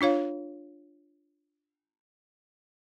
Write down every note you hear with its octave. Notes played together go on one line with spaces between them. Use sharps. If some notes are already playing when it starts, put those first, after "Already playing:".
D4 F4 C#5 F5